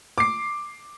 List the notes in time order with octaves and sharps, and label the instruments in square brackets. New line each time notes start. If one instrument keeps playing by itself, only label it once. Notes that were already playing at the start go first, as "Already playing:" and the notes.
[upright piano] D6 C7